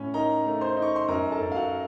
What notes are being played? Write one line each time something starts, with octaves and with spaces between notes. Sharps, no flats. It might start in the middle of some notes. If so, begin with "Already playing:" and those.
Already playing: A2 C#4
D#4 A#4 A#5
A3
C5 C6
D#4
C#6
C6
F#2 A#4 A#5
A4 A5
F#2
F5
F#4 F#5